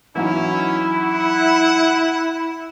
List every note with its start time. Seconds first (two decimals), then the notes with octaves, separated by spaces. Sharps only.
0.16 E3 F#3 C#4 D#4 E4 B5
0.96 F#5